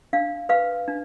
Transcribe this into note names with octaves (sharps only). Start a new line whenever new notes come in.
D4 F5
B4 F5
D4